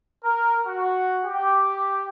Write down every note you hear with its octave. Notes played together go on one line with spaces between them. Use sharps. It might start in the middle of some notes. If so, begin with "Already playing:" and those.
A#4
F#4
G4